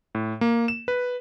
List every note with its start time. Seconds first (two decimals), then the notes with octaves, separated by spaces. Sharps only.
0.15 A2
0.41 A#3
0.68 E7
0.88 B4